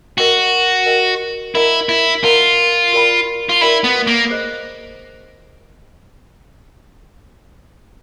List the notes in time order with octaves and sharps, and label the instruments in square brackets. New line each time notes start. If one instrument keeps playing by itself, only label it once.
[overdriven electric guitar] F#4 [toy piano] A#4 D#5 G5
[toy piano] A#4 D#5 G5
[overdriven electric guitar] E4 [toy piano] A#4 D#5 F#5 A#5
[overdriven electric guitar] E4
[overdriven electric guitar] F4 [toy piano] A#4 D#5 F#5 A#5
[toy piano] F#4 A#4 D5 G5 B5
[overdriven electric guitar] F4
[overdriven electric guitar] E4 [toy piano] F#4 A#4 D5 G5 B5
[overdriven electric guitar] B3
A#3
[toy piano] G#4 C5 D#5